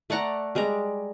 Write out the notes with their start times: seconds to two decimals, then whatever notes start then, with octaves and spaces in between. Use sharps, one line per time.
0.10 A3 D5 F#5 A#5
0.55 G3 G#3 D5 A#5